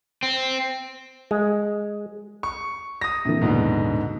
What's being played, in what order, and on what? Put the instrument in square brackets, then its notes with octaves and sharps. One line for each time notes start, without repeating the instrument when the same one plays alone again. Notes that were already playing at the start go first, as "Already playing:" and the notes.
[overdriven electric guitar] C4
[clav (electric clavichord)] G#3
[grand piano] C#6
D#6 A#6
[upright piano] A#1 E3 [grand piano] C3
[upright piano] D#1 [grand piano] G#2 B2 D3